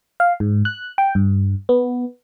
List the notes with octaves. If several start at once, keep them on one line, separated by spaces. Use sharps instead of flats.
F5
G#2
F#6
G5
G2
B3